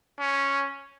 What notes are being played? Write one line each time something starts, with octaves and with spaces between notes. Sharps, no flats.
C#4